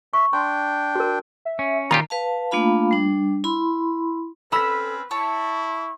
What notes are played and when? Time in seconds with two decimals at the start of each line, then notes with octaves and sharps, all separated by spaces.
0.13 E5 C#6
0.33 D4 G5 C6
0.95 F#4 A#4
1.45 E5
1.59 C#4
1.91 A#2 D#3 F4 G4 A#5
2.10 B4 F5 A5
2.51 A3 A#3 D4 F4 F5 B5
2.91 G3 D4
3.44 E4 B5 C6
4.52 C4 C#4 A4 B4 B5 E6 B6
5.11 E4 C#5 A5 C#6